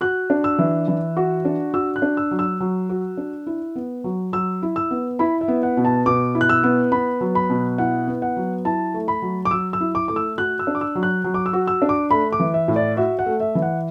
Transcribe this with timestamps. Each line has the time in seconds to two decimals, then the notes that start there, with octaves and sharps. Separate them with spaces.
0.01 F#4 F#6
0.30 D4
0.44 E6
0.59 E3
0.88 E3
1.17 F#4
1.45 D4
1.74 F#4 E6
1.96 F#6
2.02 D4
2.17 E6
2.31 F#3
2.39 E6
2.60 F#3
2.89 F#4
3.17 D4
3.47 E4
3.75 B3
4.04 F#3
4.33 F#3 E6
4.62 E4
4.76 E6
4.91 B3
5.19 E4 B5
5.41 E5
5.48 B3
5.63 F#5
5.77 B2
5.85 A5
6.06 B2 D6
6.35 E4
6.41 F#6
6.49 E6
6.63 B3
6.92 B3 B5
7.21 F#3
7.35 B5
7.50 B2
7.78 E4 F#5
8.08 B3
8.22 F#5
8.37 F#3
8.65 E4 A5
8.94 A3
9.08 B5
9.22 F#3
9.45 D6
9.51 F#3 E6
9.73 E6
9.81 E4
9.95 D6
10.08 A3 D6
10.16 E6
10.38 F#4 F#6
10.59 E6
10.67 D4
10.75 D6
10.81 E6
10.95 F#3
11.03 F#6
11.24 F#3
11.34 D6
11.46 E6
11.53 F#4
11.67 E6
11.82 D4
11.89 D6
12.11 A3 B5
12.32 D6
12.40 E3
12.54 E5
12.68 A2
12.76 D5
12.97 F#4 E5
13.19 F#5
13.26 A3
13.40 E5
13.55 E3
13.62 F#5